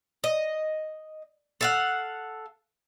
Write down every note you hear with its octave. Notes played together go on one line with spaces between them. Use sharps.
D#5
A4 F5 F#5